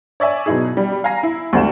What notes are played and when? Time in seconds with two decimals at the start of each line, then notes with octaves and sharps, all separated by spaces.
0.20 C#5 D5 E5 G#5
0.46 B2 F#3 D#4 E4 G#4
0.77 G3
1.04 F5 G#5 A#5 A#6 C7
1.23 E4
1.53 D2 G#2 G3 A3 F#4 E7